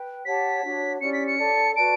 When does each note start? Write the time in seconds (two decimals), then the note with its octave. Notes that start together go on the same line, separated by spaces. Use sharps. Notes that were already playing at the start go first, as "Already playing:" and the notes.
Already playing: B4 G5
0.25 G4 C#5 F#5 A5 B6
0.62 D4 F#4 C#5
1.00 C#4 E4 G4 D5 C#7
1.13 B6
1.27 C#7
1.38 A4 D5 A5
1.76 F#4 B4 D5 A5 D7